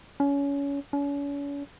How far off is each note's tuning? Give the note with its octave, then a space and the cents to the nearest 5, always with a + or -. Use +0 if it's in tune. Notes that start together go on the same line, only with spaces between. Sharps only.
C#4 +25
C#4 +40